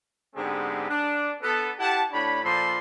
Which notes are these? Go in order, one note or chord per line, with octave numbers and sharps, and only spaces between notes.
G#2 D3 G#3 B3 C4 G4
D4
B3 A4
E4 G4 F#5 A5
A2 D4 C#5 B5
A#2 F3 A4 D5 B5 C6